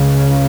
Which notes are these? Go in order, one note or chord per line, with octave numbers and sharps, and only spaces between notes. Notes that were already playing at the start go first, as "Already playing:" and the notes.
Already playing: C#2 C#3